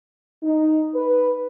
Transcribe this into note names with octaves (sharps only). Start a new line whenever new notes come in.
D#4
B4